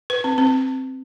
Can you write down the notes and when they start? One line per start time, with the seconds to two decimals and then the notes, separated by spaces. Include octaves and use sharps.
0.10 B4
0.24 C4
0.38 C4